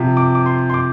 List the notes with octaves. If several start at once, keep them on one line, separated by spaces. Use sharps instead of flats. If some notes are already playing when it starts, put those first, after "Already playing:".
Already playing: C3 F3
D6
D6
C6
C6
D6